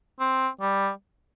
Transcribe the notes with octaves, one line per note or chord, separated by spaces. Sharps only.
C4
G3